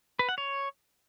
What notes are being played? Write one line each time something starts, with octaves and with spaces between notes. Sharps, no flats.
B4
F#5
C#5